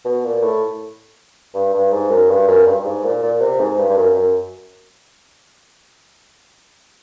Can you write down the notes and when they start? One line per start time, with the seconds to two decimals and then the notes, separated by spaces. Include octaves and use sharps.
0.05 B2
0.25 A#2
0.43 A2
1.54 G2
1.74 G2
1.92 G#2
2.10 F#2
2.29 G2
2.48 F#2
2.66 G2
2.79 G2
2.84 G#2
3.04 A#2
3.22 A#2
3.41 C3
3.60 G#2
3.78 G2
3.89 G2
3.97 F#2
4.15 F#2